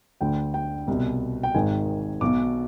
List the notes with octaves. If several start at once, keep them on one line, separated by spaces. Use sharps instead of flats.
D2 D3 G5
G5
C2 B2
G5
G#1 G#2 D#3 G#5
B1 B2 D6